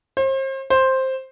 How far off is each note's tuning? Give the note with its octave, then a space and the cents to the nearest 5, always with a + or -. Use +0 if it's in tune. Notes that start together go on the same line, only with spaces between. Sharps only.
C5 +40
C5 +10